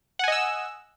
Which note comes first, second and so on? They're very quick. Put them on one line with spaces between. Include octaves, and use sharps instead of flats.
F#5 G#5 D#5 E6